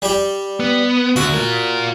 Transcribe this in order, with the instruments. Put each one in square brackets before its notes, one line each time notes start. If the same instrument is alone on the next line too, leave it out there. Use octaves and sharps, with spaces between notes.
[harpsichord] G3 G4
[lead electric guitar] B3
[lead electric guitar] D2 [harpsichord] F#4
[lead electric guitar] F4 A#4